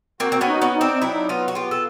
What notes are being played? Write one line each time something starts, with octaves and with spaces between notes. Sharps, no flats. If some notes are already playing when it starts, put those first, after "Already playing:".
A#3 C4 F#4
C4
B3 C#4
D#4
B3 C#4
D#4
C4 D4
F#3 D4 E4
B3 D#4 F4
F#4
B3 F4 G4
A4